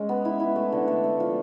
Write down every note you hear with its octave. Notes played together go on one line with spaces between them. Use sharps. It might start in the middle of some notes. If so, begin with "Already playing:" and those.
Already playing: G#3 C#4
B3
E4
E4
A3
D3
A3
A3
F3